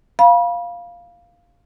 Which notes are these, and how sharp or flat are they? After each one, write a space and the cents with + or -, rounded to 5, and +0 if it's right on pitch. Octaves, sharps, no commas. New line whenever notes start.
F5 +0 B5 -35